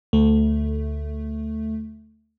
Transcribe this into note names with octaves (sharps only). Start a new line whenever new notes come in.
D2 A3